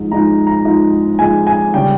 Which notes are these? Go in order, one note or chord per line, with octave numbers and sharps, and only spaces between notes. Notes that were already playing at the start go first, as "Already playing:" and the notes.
Already playing: G#2 F3 G#3 D#4
G#2 F3 G#3 D#4 A#5
A#5
G#2 F3 G#3 D#4
G#2 F3 G#3 D#4 G#5
G#5
C#3 G3 C#4 G5